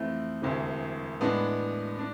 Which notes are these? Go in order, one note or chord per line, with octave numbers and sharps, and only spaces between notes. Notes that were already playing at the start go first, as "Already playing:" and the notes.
Already playing: F2 E3 A3 C4 E4
E1 D2 C3 E3
A2 G#3 B3 D4
D4